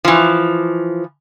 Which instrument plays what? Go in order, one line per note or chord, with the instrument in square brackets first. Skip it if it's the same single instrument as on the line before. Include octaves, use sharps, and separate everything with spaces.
[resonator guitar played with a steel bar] E3 F3